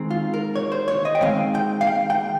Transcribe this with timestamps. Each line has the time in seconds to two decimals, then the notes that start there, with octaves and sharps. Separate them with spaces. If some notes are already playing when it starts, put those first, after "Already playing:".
Already playing: D#3 G#3 C4
0.11 F4
0.34 A#4
0.56 C#5
0.72 C5
0.88 C#5
1.05 D#5
1.15 G5
1.21 D#3 G#3 C4 F5
1.55 G5
1.81 F5
1.87 G5
2.10 G5